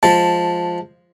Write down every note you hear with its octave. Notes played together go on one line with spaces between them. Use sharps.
F3 G#3 A5